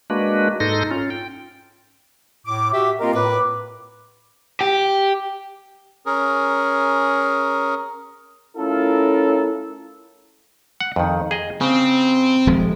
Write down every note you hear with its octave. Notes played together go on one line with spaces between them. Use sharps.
G#3 A#3 D4 F#4 B4
G#2 D#4 A4 C6 A#6
C#4 F4
G5
A2 D6
F#4 G4 E5
A#3 C4 F4 G4 A#4 D#5
A2 B4 D6
G4
C#4 G#4 A#4
A3 C#4 E4 F4 A4 A#4
F#5
F2 D#3
G#4 D#5
C#3 C4
D#1 F3 G#3